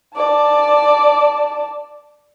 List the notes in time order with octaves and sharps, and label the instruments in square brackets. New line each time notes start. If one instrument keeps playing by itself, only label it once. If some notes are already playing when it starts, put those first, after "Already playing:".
[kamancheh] D5 A5